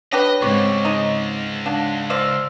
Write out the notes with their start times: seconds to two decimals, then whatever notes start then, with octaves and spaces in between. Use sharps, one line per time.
0.12 D4 G4 B4 C#5 D#5
0.42 C#2 G#2 C4 C#5 C#6 D6
0.85 G#3 D#4
1.66 D4 F5 F#5
2.10 C5 D5 F5 E6 F6